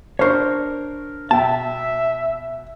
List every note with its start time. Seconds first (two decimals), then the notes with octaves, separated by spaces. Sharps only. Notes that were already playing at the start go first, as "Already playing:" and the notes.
0.19 D4 A#4 C5 C#5 C#6
1.31 B2 E5 G5 A5